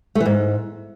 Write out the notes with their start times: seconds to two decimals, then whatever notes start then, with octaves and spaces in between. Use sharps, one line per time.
0.15 A3
0.20 E3
0.26 G#2